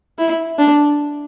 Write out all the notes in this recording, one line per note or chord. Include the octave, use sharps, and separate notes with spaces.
E4
D4